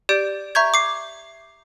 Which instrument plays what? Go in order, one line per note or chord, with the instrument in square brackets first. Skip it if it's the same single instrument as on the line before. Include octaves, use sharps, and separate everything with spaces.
[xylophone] G4 D5 G6 D7
E5 A#5 C#6 G6 G#6
D6 C7